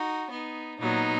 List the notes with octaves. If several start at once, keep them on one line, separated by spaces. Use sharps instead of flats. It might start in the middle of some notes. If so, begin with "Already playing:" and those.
Already playing: D#4 F#4
B3 D#4
A#2 F#3 B3 D#4